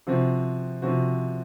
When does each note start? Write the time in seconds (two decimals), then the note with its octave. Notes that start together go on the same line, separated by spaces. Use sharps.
0.07 C3 F3 C4 F#4
0.82 C3 F3 C4 F#4